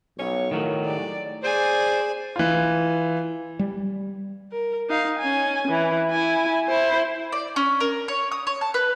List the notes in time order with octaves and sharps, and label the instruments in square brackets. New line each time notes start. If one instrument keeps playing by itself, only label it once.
[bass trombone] B1 [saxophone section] F3 C#5
[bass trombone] A2 [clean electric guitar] D#3 F#3 [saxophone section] F3
[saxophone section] G#3 A#3 G4 [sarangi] D5
[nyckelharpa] G#4 G#5 [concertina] C5 [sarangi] D5
[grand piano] E3 F4
[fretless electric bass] G3
[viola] A#4
D#4 F5
C#4 G#5
E3
E4 G#5
E4 C5
[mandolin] D5
C#4
A#4
C#5
D#6
C#5
A5
B4